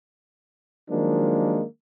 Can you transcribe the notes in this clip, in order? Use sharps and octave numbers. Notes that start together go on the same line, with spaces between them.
D#3 F3 F#3 G#3 A#3 D4